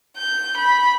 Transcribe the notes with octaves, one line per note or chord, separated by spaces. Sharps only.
G6
B5